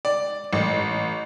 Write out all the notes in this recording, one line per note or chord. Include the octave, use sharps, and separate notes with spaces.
D5
A1